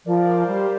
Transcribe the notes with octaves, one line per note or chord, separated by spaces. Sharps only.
F3 A#4 D5
C5 F5
C5 F5
G3 G4 C5